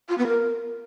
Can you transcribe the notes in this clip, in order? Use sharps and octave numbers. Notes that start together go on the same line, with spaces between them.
F4
B3
A#4